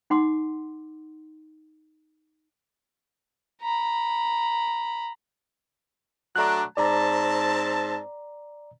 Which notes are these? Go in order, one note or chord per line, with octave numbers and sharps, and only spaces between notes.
D#4 F#5 C6 D6
A#5 B5
F#3 A3 D4 A#5 F#6
G#2 C4 D5 A5 A#5